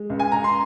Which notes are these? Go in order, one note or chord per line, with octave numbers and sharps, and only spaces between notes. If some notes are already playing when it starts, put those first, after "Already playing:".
Already playing: G#3
C#2
G#5
A#5
C6